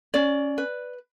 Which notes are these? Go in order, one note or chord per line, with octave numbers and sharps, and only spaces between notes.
C#4 D5
B4